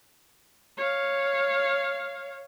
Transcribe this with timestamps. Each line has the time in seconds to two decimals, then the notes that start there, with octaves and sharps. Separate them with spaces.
0.77 C#5 F5